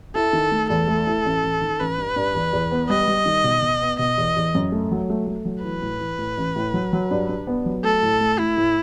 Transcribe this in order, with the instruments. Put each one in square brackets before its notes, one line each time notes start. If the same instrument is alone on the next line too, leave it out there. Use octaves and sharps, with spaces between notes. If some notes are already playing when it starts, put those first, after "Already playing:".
[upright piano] E4 [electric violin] A4
[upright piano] D#3
A3
[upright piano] E2 [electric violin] A4
[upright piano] A3
E4
A1
A1
D#3
[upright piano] A1 [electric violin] B4
[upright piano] G2
G2
E2
E2
B3
[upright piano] G3 [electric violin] D#5
[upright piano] G3
D#3
B2
B2
B3
[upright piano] B2 [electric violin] D#5
[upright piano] E2
E2
F#2
A3
F#3
A3
A3
F#3
[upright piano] E3 [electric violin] B4
[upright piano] A2
E3
A2
A1
A2
F#3
F#3
G2
G2
B3
F#3
[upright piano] A3 [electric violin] A4
[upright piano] A2
A3
[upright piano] A3 [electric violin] E4
[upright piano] A2